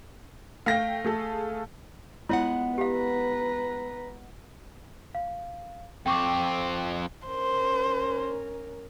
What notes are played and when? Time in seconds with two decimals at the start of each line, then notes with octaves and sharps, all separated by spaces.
0.66 A3 F5 G5 A#6
1.04 A3 G#4 A4
2.29 G#3 B3 E4 F4 C#5 F#5
2.78 G4 B4 F5 A#5
5.15 F5
6.06 F2 C4 G5 C#6 D6
7.28 C#4 A#4 C5